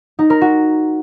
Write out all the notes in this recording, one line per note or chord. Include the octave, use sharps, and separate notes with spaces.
D#4
A#4
F#4